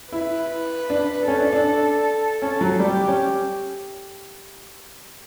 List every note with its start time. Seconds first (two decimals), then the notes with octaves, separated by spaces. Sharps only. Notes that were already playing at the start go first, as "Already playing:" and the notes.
0.12 E4 B4
0.90 D4
1.27 C#4 A4
1.40 D4
1.53 D4
2.42 C#4 A4
2.61 F#3
2.80 G3 G4
3.08 C#4